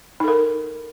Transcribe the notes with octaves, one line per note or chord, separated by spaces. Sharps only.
D#4 A4 A#4